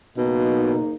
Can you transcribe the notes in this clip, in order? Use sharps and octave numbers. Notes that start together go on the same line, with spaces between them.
F#1 B2 A#3 D#4